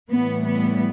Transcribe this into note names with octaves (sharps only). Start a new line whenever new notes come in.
A2 E3 G3 B3
B3